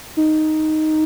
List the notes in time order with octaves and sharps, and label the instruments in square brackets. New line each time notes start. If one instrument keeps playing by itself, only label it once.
[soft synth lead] D#4